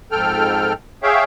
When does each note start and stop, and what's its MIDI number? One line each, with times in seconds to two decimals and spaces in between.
0.11 0.73 41
0.11 0.73 44
0.11 0.73 69
0.11 0.73 79
0.11 0.73 89
1.03 1.24 68
1.03 1.24 73
1.03 1.24 76
1.03 1.24 77
1.03 1.24 79